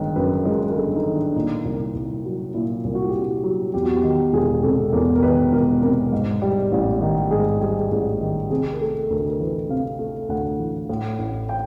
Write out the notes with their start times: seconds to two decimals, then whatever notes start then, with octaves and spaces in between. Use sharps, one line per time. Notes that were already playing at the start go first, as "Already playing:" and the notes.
Already playing: G1 D#3 G#3
0.16 F#2 B4
0.45 G#3 A#4
0.68 A#4
0.76 G1 A4
0.96 D#4
1.06 D#3
1.16 D4
1.36 A#2 D#4
1.65 C2
1.95 C2
2.25 F#3
2.54 A#2 E4
2.84 C2
2.95 F#4
3.08 G4
3.14 C2
3.21 F#4
3.44 F#3
3.74 E2 G4
3.85 F#4
3.96 G4
4.03 D#3
4.33 E1 G#4
4.63 C3 A4
4.93 E2 A#4
5.15 A#4
5.23 D#3 B4
5.52 E1 A#4
5.82 C3 A#4
6.12 G#2
6.42 G3
6.72 A1
7.01 D#3
7.31 G#2 G#4
7.61 G3 G#4
7.92 A1 G#4
8.21 D#3
8.50 C3 G#4
8.73 A#4
8.80 A3 A4
9.10 D2 A#4
9.28 A#4
9.40 E3 B4
9.69 C3 F5
9.99 A3
10.29 D2 F#5
10.59 E3
10.90 A2
11.19 A1
11.49 G5